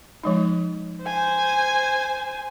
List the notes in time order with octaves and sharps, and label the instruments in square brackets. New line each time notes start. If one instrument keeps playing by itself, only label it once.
[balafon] F3 G#3 D#4
[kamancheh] C5 G#5